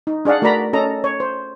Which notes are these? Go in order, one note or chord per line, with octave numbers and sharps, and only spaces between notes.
D#4
D4 G#4 D5 F5 F#5
A3 F#4 A#4 D5 A#5 B5
C#4 A4 D#5 A#5
C#5
C5